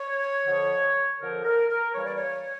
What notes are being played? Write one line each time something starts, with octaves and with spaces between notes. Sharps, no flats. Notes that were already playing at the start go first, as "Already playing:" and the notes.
Already playing: C#5
F2 D3 F3
F2 D3 F3 A#4
A#4
A#4
E2 E3 G3 A#3 C#5
D5
C#5